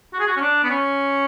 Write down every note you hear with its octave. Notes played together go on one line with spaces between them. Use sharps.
F#4
G#4
F#4
C#4
D4
B3
C#4